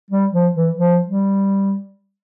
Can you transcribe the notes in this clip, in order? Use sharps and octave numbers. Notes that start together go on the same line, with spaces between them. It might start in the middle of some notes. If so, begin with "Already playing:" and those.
G3
F3
E3
F3
G3